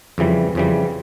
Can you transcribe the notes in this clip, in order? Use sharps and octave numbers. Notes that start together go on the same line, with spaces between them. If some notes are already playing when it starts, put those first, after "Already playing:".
F2 C#3 E3 G3
F2 C#3 E3 G3